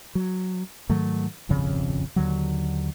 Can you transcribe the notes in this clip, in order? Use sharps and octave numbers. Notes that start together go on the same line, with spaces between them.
F#3
G#2 D#3 F#3 A3
D#1 G#1 F2 C#3
D#2 D3 F#3